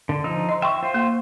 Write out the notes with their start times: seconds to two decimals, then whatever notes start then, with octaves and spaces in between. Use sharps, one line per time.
0.09 D3
0.24 F3 D#4 E6
0.49 D#5 C6
0.62 E5 G5 C6 C#6
0.83 F4 C5
0.94 A#3